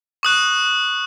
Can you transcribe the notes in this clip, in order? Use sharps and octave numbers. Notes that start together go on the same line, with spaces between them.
C#6 D#6 F#6